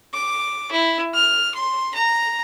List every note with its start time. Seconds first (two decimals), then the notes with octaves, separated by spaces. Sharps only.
0.14 D6
0.71 E4
1.13 F6
1.54 C6
1.94 A#5